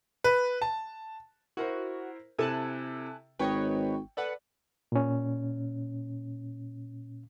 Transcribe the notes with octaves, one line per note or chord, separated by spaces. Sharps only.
B4
A5
E4 F#4 A#4 C5
C3 E4 A4 G#5 A5 F#6
G#1 B4 C#5 D#5 G5 C#6
A4 B4 D5 F#5
A#2 C#4